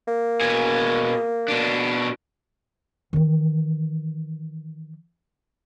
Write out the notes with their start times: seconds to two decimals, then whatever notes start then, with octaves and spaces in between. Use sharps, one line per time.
0.08 A#3
0.41 B2 G#4
1.48 B2 D4
3.13 D#3 E3